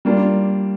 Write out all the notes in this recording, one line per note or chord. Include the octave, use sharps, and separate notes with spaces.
G3 A#3 D4 F4